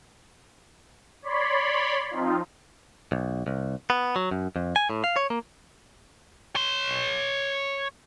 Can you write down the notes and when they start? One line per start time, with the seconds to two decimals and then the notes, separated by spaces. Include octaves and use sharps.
1.22 C#5 D5 B5 C6
2.10 F3 C4 D#4 F4
3.12 B1
3.47 C2
3.90 B3
4.16 F#3
4.31 F#2
4.56 F2
4.76 G#5
4.90 A2
5.04 F5
5.16 C#5
5.30 A#3
6.55 C#5 C6